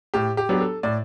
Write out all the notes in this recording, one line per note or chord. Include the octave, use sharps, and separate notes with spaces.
A2 G4
G4
F#3 B3 D4 G4
A4
A2 D5